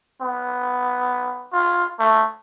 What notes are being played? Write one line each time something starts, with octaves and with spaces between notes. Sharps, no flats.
B3
F4
A3